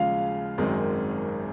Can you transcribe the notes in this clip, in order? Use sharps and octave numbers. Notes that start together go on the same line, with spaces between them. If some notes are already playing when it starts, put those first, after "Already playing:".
Already playing: D#2 C#3 F3 G#3 F4 F5
G#1 F#2 D#3 G#3 C4